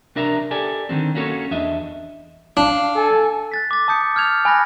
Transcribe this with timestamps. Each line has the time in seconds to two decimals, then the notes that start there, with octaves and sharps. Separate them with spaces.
0.15 C2 D4 A#4 E5 A#5
0.51 G4 A4 D5 G#5
0.89 D3 D#3 F#3 C4
1.15 A#3 C#4 F#4 A4 A#4 C#5
1.51 E2 D4 D#5 E5
2.57 D4 F5
2.96 A4 G#5
3.52 F#6 A6 B6
3.71 D6 A6
3.88 A5 D#6 G6 C#7
4.16 F6 G6 G#6 F7
4.45 G#5 B5 F#6 A#6